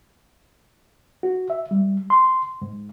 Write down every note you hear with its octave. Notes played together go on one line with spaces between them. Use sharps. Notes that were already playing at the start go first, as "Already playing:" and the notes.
F#4
E5
G3
C6
G#2